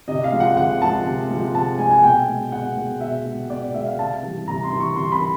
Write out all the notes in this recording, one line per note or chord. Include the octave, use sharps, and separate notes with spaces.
C3 D#5
F5
F3 G#3
F#5
C3 F#5
F3 G#3 A5
C3
F3 G#3
C3 A5
F3 G#3 G#5
G#5
B2 G5
G#3
B2 F#5
G#3
B2 E5
G#3
B2 D5
G#3 E5
F5
C3 A5
E3 G3
C3 A#5
C6
E3 G3
C#6
C3 C6
B5
E3